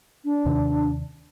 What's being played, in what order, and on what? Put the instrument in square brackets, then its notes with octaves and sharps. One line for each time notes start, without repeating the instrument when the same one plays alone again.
[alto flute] D4
[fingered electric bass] D#2 C3 D#3